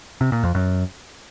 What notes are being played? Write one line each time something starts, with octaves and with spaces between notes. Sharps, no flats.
C3
A#2
F2
F#2